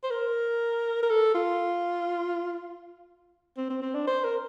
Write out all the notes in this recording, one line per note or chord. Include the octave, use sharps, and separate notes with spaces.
C5
A#4
A#4
A4
F4
C4
C4
C4
D4
C5
A#4